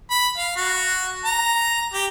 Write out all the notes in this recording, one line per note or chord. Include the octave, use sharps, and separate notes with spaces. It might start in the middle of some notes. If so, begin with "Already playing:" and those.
B5
F5
F#4
A#5
G4